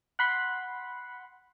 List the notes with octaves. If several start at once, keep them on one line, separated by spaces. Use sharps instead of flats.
F#5 B5 C6